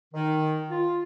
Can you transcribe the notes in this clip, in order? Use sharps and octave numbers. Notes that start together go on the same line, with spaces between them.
D#3
F4